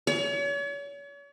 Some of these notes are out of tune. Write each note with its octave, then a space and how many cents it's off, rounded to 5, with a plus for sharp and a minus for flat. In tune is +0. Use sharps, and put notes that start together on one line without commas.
C#5 +40